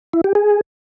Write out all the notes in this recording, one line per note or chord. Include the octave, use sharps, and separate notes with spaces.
E4
G4
G#4